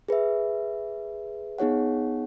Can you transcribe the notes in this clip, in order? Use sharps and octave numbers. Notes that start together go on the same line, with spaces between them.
G#4 B4 E5
B3 D#4 G#4 C#5 F#5